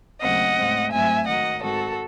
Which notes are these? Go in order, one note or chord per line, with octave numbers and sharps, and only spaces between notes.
D#2 C#3 F#3 A3 C4 D#5 F#5
A2 G#3 C4
G#2 F#3 A3 C4 E5 G#5
G#2 D#3 F#3 D#5 F#5
G#2 D#3 G#3 C4 F#4 A4